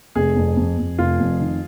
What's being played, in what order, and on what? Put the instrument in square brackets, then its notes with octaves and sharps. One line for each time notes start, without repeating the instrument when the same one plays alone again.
[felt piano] F1 [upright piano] G#4
[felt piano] F2
F2
F2
[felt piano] F1 [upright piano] F4
[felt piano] F2
D#3